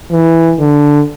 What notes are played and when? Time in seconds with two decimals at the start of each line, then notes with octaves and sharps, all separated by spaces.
0.11 E3
0.59 D3